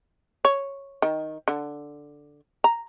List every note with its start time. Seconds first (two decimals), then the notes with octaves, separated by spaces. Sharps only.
0.45 C#5
1.02 D#3
1.48 D3
2.64 A#5